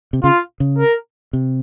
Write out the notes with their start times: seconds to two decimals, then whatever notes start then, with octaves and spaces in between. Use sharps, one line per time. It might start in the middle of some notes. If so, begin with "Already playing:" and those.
0.13 C3
0.24 C#3 F4
0.60 C#3
0.78 A#4
1.33 C3